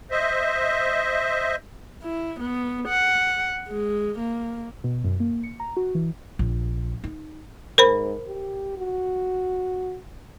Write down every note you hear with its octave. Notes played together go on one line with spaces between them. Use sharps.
C5 D#5 E5
E4
B3
F#5
G#3
A#3
B2
F#2
A#3
C#7
A#5
F#4
E3
A#1
D#4
G#2 A#4 C5 B5
G4
F#4